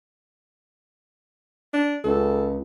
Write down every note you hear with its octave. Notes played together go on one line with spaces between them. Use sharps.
D4
C#2 A4